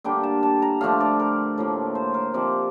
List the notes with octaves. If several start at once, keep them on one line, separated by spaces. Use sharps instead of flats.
D3 G3 A#3 D4 G5
A5
A5
A#5
D3 F3 A3 D4 F5
D5
A#4
A2 F3 A#3
C5
A#4
C3 F3 C4 D5